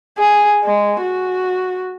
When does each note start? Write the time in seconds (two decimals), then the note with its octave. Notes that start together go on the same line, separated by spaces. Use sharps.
0.19 G#4
0.64 G#3
1.02 F#4